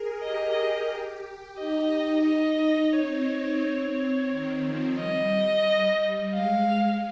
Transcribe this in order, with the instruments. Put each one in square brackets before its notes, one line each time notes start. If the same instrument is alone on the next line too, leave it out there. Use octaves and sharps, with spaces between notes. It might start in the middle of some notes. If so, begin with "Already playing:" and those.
Already playing: [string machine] G#4 A#4
[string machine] G4 [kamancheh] D#5
[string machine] D#4 [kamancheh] D#5
[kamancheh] D#5
[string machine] C4 [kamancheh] C#5
[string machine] D#3
F3
[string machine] G3 [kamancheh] D#5
[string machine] G#3 [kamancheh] F5